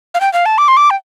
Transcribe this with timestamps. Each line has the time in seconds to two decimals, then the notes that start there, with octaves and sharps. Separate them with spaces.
0.14 F5
0.21 G5
0.33 F5
0.46 A5
0.58 D6
0.68 C6
0.77 D6
0.90 G5